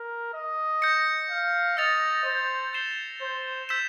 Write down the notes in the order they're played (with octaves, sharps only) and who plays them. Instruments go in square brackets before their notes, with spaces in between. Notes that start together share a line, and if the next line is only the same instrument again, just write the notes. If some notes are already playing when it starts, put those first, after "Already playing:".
Already playing: [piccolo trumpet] A#4
D#5
[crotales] G6 A#6 C#7
[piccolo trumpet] F5
[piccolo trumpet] D#5 [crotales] E6 A6 C#7 F7
[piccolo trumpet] C5
[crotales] G6 C7 E7 G7
[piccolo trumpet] C5
[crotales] E6 G6 B6 E7